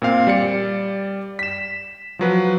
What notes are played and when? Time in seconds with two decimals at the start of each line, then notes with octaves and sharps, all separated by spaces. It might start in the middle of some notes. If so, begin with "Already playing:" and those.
0.02 A#2 C4 F5
0.27 G3 D5 C#7
1.39 B6 E7
2.19 F3 F#3 B4